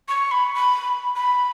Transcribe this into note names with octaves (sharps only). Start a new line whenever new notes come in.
C#6
B5
B5
B5